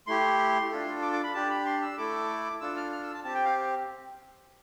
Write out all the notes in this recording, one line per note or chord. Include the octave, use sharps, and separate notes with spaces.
A3 E4 G4 C6
D4 F4 A4
D6
D6
B5
D4 G4 A5
B5
C6
E6
A3 E4 A4 D6
D4 F4 A4 E6
F6
F6
E6
A5
C4 G4 A5
G5
F5